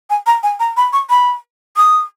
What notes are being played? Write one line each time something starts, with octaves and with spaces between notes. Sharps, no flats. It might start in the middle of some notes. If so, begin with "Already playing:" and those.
G#5
A#5
G#5
A#5
B5
C#6
B5
D#6